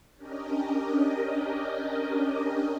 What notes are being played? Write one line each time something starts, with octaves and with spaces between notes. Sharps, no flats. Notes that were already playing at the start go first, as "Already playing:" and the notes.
C#4 D4 G4 A#4 D#5